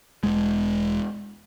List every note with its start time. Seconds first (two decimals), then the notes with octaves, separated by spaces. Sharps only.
0.23 E1 G#3